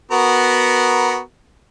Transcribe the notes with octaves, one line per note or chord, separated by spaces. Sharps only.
B3 F#4 A#4